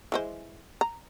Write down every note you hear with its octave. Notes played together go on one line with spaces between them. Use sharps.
E3 G#3 C5
A#5